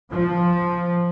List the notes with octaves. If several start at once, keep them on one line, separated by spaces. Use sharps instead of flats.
F3